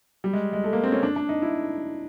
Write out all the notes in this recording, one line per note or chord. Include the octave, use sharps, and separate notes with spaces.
G3
G#3
G#3
A3
A#3
C4
C#4
D4
D4
D#4
E4